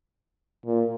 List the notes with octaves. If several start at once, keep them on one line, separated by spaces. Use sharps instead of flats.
A#2